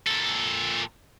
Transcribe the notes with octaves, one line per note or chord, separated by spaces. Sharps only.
A#2 A4